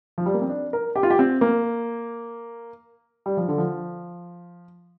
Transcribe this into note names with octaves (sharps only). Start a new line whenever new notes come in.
F3
G3
A#3
C4
D4
A#4
G4
F4
G4
C4
A#3
G3
F3
D3
F3